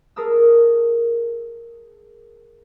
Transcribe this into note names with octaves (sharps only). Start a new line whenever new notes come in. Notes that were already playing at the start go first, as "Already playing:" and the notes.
G#4 A#4 A5 D#6 E6